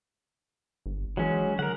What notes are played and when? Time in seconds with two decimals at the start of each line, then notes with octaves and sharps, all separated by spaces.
0.86 G1
1.17 E3 F#3 G#3 C#4
1.59 D3 A#4 F#5